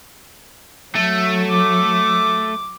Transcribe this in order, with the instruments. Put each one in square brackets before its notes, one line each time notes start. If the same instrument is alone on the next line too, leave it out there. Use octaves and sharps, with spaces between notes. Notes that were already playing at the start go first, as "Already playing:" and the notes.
[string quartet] F#3 [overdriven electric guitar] A3
[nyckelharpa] D6